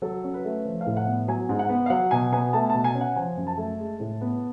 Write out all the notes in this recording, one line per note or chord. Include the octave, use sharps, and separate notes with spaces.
F#3 A4
C#4
B4
A3
F3 B4
F5
A2
F#5
B3
F#3 G#5
G#2
F#5
B3
F5
F#3 F#5
B2 G#5
B3 G#5
A3 A5
B2 A5
G#5
C#4
F#5
F3 G#5
F#2
A5
A3
G#3
A2
B3